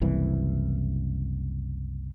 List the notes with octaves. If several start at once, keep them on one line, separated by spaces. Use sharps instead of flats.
F#1 C2 E3